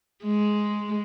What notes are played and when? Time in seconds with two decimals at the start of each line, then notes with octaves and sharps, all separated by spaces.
0.24 G#3